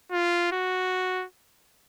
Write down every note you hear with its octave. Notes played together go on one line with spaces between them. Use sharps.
F4
F#4